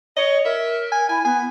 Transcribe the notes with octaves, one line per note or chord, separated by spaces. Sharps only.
C#5 D#5
A#4 E5
G#5
E4 G#5
B3 G#5